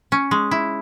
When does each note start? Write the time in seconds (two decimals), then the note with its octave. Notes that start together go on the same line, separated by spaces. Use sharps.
0.12 C#4
0.31 G#3
0.51 E4